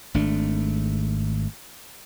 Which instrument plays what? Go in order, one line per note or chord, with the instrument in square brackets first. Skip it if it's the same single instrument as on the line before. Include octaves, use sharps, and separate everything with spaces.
[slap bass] G#1 A3 D4